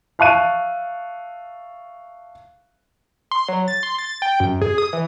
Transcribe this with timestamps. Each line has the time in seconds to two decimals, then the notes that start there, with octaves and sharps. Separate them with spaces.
0.19 E5 F5 A5 C#6 F#6 D#7
3.31 C6
3.49 F#3
3.68 A6
3.83 C6
3.98 A6
4.22 G5
4.40 F#2
4.61 G#4
4.78 D#6
4.93 E3